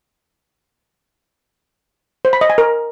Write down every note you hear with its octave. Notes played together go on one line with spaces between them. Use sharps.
C5
B5
D#5
G#5
A#4